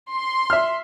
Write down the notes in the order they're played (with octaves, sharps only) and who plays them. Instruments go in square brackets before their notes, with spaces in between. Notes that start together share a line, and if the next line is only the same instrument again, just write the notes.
[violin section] C6
[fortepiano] E5 F6